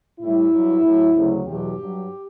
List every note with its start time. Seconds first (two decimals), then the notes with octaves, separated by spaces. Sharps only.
0.20 A2 G3 E4
0.52 G2 F#3
0.83 A2 F#3
1.14 D2 C#3 F#3
1.45 E2 B2 F#3 G4
1.77 G2 F#3